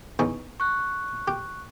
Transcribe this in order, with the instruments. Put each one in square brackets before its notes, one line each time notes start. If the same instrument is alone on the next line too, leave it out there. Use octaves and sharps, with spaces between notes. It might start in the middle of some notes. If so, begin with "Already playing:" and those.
[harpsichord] E2 C#4 D#4
[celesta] C#6 F#6
[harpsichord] G4